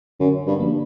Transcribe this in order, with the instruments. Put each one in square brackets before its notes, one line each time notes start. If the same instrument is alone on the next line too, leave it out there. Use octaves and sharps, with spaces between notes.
[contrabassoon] F#2 [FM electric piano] D3
[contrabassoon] G2
[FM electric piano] F3 A#3